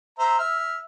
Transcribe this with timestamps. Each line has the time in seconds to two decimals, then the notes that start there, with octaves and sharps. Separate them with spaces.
0.19 C5 E5 A#5
0.38 E5 F6